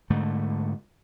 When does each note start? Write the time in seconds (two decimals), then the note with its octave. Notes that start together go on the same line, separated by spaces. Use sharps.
0.10 G#2 D3 A3